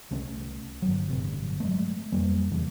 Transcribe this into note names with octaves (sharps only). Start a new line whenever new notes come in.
C2 A3 C#4
G1 F#3
G1 A2 C3
F#3 G#3 A3
F2 G3 A#3
E2 C#3 E3